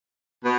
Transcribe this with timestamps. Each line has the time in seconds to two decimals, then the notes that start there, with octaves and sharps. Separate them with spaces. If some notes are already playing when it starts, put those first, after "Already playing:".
0.43 B2